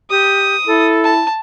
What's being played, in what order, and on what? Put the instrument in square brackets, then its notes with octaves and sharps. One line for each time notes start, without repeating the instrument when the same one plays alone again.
[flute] G4 [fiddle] D#6
[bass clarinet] E4 [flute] A4
[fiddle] A5